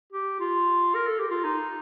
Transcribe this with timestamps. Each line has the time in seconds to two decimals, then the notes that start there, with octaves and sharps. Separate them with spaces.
0.13 G4
0.40 F4
0.95 A#4
1.07 A4
1.19 G4
1.31 F4
1.44 D#4